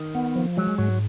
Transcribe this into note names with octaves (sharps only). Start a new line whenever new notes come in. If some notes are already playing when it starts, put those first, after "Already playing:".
Already playing: D#3
B3
F3
F#3 G#3
G#2 F#3